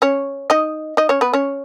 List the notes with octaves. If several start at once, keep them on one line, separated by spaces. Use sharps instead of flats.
C#4 C#5
D#4 D#5
D#4 D#5
C#4 C#5
B3 B4
C#4 C#5